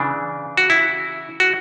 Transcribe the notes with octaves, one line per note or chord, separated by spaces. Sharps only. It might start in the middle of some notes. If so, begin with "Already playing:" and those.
Already playing: C#3 E3 D4
F#4
E4
F#4